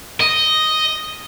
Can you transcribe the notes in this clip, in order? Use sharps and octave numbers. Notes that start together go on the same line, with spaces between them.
D#5